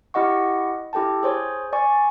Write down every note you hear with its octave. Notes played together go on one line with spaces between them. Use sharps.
E4 G4 D#5 F#5 C#6
E4 G4 A4 G5 A5
G#4 C5 C#5
D5 G#5 C#6